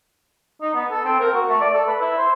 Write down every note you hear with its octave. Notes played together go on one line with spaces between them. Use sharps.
D#4
B3
A4
C4
A#4
F#4
A3
D5
A4
B4
E4
C5